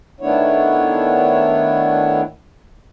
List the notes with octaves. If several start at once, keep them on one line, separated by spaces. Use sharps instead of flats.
D#3 A3 B3 D4 E4 C#5